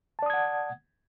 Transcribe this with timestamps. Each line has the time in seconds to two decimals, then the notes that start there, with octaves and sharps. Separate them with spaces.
0.19 A5
0.22 D5
0.26 D#6
0.30 G#6
0.34 F#5